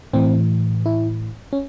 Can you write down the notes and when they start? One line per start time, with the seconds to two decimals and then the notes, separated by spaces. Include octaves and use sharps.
0.13 A2 E3 C4
0.86 E4
1.53 C#4